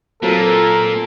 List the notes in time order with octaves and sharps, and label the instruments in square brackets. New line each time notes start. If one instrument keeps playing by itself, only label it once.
[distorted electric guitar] A#2 [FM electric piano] F#3 C4 F4 [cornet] A4 [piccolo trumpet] A#4